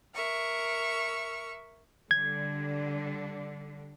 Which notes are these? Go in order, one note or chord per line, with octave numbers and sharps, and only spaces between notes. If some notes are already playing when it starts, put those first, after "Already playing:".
A#4 E5 C#6
D3 G3 D4 G#6